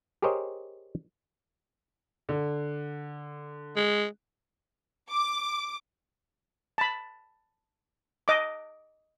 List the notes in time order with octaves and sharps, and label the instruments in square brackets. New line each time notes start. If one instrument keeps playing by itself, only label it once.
[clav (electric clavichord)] G4 G#4 A#4 C5 C#5 D#5
[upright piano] D3
[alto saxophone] G#3
[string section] D6
[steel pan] A5 B5
D#5 D6